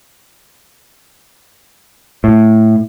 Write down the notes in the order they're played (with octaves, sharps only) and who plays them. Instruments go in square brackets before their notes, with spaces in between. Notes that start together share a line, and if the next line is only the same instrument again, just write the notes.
[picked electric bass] A2